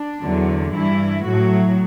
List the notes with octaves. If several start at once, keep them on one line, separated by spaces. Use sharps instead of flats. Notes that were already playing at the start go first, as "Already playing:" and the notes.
Already playing: D4
E2 D3 F#3
G2 E3 E4
A2 F#3 F#4